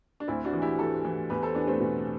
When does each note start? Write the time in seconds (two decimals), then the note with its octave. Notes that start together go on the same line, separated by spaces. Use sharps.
0.20 D4
0.28 D2 C4 E4
0.45 D4 F#4
0.53 E3
0.62 E4 G4
0.79 E3 F#4 A4
1.05 E3
1.30 E2 G4 B4
1.43 A4 C5
1.55 E2 B3 D4
1.67 A3 C4
1.80 B2